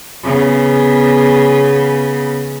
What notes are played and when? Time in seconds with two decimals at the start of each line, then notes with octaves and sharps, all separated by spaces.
0.24 C#3 B3